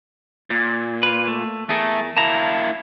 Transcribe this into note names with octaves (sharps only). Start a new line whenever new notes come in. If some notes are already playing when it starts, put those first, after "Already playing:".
A#2
F4 B4
A3
E2 A3 G#4 A#4
A#3 E4 A5 A#5